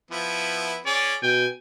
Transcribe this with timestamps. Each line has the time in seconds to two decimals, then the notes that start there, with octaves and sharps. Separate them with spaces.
0.11 F3 B3 E4
0.86 C#4 G#4 D5
1.22 B2 G5 G#5